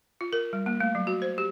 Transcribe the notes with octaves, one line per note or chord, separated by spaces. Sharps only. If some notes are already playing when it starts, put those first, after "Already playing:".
F4
A#4
G3
A#3
A3
F#3
F#4
C5
G4